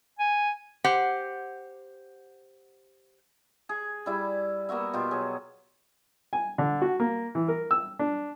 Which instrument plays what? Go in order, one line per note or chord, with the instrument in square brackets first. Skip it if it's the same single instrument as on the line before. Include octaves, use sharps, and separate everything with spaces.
[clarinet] G#5
[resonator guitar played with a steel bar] G4 C5 F#5
[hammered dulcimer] G#4
G3 E4 D5
A#3 B3 F#4 E5
B2 F4 G4
F#3 G#4
[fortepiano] G#5
D3
F#4
A#3
E3
A#4
E6
D4